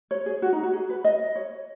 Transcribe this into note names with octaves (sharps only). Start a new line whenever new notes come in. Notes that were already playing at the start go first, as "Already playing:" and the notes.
C#5
G#4
F#4
D#4
F#4
G#4
B4
D#5
C#5